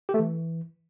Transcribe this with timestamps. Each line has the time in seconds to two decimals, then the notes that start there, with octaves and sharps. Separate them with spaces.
0.09 G4
0.14 A3
0.19 E3